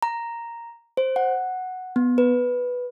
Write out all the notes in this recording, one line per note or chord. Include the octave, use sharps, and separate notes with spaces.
A#5
C5
F#5
B3
B4